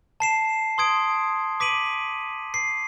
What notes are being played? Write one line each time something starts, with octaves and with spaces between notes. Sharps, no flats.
A5 C7 E7
C6 D#6 G#6 D7
D6 B6 D7 D#7 F#7
C7